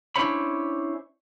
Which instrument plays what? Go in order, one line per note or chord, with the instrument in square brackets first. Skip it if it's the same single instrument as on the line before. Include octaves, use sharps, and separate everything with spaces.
[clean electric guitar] C#4 D4 E4 C5 C#5 B5